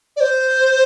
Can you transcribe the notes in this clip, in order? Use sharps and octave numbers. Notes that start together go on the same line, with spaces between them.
D5
C5